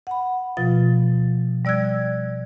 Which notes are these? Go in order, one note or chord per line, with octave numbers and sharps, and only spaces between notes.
F#5 B5
B2 F3 F4 A6
G3 D5 E6 F#6 G#6